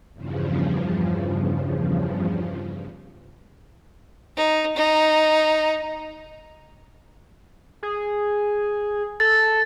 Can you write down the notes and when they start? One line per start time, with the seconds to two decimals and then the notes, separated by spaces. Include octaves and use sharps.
0.14 E2 G2 C#3 F3
4.37 D#4
4.76 D#4
7.83 G#4
9.20 A4 A6